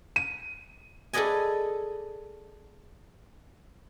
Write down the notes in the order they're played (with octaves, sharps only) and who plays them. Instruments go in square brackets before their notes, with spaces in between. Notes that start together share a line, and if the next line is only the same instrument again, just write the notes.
[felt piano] D#7
[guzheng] G#4 A4 B4 D5 D#5 G#5